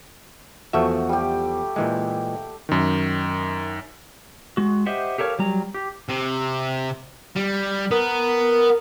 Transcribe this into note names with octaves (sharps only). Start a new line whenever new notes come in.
E2 F3 A3 F#4 E5
G3 G4
A#2 E3 G#3
F#2 D#3
G#3 F#4
G4 C5 D#5 E5 F#5
G4 A4 A#4 C#5 F5
F#3 G3 A#5
G4
C3
G3
B3 A#4